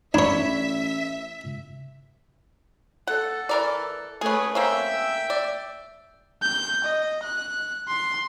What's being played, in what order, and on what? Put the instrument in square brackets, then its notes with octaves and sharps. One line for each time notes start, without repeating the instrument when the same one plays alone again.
[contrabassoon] A1 [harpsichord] D4 C#5 [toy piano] D5 B5 C#6 [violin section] E5
[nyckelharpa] A4 [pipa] F#5
[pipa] E3 A#4 D5
[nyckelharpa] A3 B4 [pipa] C#4 G#4
[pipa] A#3 C4 C#4 [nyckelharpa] E5 G5
[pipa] D5
[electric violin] G6
D#5
F#6
C6